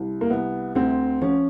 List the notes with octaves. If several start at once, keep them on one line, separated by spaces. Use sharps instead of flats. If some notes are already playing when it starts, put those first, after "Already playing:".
Already playing: C2
A#3
C2 B3
D2 C4
F3 C#4